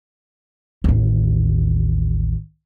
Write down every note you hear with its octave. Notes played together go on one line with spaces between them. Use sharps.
A1 D#2